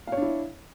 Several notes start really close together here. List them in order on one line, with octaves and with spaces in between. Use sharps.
F5 C#5 D4 E4